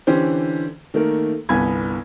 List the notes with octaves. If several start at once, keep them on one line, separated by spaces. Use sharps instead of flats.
D3 E3 C#4 G4 C5
D#3 A3 A#3 A#4
G1 C2 B3 G#5 B5 G#6